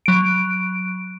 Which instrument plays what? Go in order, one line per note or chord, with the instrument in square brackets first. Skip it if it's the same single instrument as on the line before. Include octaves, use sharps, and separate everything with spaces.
[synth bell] F#3 D7